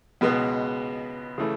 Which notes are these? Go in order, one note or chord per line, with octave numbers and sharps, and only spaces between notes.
C#2 B2 G#3 B3
C#3 E3 A3